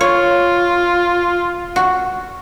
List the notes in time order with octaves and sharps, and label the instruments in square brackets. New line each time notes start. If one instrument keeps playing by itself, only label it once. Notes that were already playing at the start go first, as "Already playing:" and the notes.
[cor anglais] F4 [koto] C#5
[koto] F#4